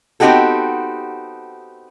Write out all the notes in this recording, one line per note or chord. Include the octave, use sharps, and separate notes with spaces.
B3 C4 D#4 F#4 G4 A4